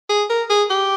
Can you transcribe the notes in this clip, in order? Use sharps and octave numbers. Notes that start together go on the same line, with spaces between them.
G#4
A#4
G#4
G4